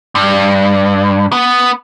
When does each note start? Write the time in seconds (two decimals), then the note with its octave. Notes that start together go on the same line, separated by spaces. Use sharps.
0.15 G2
1.32 B3